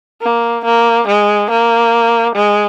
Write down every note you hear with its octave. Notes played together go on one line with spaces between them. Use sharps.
A#3
A#3
G#3
A#3
G#3